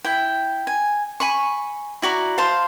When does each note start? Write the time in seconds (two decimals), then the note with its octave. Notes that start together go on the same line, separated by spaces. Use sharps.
0.05 E4 G5
0.67 G#5
1.20 G#5 B5 C#6
2.02 E4 F#4 D5 A#5
2.38 C5 F5 A5 C6